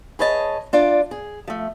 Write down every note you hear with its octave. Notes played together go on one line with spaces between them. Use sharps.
G#4 B4 C#5 D#5 A5
D4 F4 D5
G#4
F3 A3